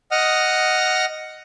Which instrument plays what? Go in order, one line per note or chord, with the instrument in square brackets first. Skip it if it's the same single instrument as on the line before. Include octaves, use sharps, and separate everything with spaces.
[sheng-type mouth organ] D#5 F#5 D#6 F6